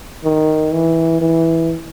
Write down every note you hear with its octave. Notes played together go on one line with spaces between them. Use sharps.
D#3
E3
E3